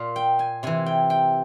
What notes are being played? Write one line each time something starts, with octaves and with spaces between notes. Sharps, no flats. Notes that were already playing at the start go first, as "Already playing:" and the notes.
Already playing: A#2 F5
G5
G#5
C3 E3 G#5
G5
G5